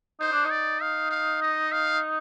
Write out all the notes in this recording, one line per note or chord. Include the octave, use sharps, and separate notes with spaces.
D#4 C5
D4
D#4
D5
F5
F5
D#5
F5